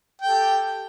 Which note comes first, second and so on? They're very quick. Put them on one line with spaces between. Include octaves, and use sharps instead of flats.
G5 A4 G4